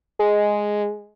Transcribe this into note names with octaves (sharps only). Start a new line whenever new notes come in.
G#3